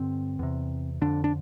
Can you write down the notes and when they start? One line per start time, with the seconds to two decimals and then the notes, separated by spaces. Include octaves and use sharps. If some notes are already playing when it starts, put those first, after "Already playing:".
Already playing: G2 D3 C4
0.39 E2 C3
1.01 F2 D3 D4
1.24 D4